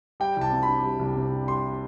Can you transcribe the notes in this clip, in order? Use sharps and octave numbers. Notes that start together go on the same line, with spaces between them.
G3 G5
C2 A5
C3
D4 B5
G3
C2
C3
D4
G3 C6